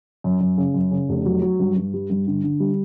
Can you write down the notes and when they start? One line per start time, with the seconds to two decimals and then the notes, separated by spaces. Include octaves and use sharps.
0.24 F#2
0.41 F#2
0.57 C#3
0.74 F#2
0.91 C#3
1.09 F1
1.25 F#3
1.42 F#3
1.60 G2
1.76 G2
1.93 G3
2.10 G2
2.27 D3
2.43 D3
2.60 G3